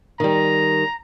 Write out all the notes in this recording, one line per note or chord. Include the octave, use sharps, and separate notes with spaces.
D#3 G3 A#5